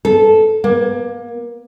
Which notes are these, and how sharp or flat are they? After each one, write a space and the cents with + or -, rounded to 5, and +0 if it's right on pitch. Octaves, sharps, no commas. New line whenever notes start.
A4 -10
A#3 +25